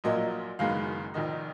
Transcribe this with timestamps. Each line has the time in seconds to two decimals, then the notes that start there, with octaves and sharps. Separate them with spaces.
0.04 A#1 A#2 F#3 A#3 D#5
0.59 F#1 F#2 D#3 G#3 B3 F5
1.14 F1 F2 D#3 D#5